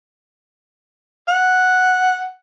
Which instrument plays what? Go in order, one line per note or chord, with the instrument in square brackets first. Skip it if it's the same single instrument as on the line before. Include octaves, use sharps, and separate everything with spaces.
[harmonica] F#5